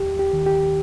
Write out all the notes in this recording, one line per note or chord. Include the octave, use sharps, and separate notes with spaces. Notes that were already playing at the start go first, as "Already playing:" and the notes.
Already playing: D#2 G4
G4
D#3
G4